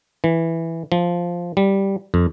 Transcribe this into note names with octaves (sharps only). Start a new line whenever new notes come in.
E3
F3
G3
F2